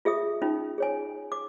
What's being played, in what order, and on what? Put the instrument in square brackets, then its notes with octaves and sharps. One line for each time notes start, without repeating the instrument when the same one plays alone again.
[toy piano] F4 G#4 E5 D#6
C#4 D#4 F4
G#4 C#5 G#5
D6